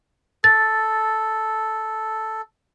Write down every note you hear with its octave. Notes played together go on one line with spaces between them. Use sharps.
A4 A6